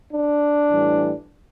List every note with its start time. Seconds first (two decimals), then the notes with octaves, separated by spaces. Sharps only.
0.13 D4
0.70 A2 E3 G3